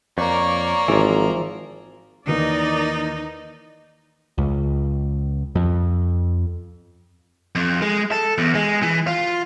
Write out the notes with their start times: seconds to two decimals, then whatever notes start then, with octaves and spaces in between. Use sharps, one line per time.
0.18 F2 A#3 A#4 C#5 D5 C#6
0.88 G#1 E3 F3
2.27 D#2 E3 A#3 D#4 A#4 D5 D#5
4.38 C#2
5.55 F2
7.55 F2
7.82 G#3
8.12 A4
8.38 E2
8.55 G#3
8.83 E3
9.07 F4